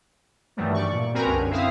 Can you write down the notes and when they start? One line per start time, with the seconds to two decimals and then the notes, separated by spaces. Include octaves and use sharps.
0.57 G2 D#3 E3 F#3 G3 A3
0.74 D5 C#6
0.92 A#2
1.14 C4 F#4 A#4 B4 G#5 A#5
1.26 C2 F#2 D3
1.50 C4 E4 E5 F5 D#6